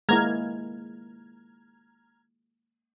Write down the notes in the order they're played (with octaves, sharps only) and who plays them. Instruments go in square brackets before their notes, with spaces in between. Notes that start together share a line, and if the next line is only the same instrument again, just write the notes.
[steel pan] G#3 A#3 E4 [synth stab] A#5 F6 G#6